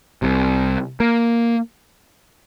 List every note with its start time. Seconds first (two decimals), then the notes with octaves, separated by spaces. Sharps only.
0.22 C2 C3
1.00 A#3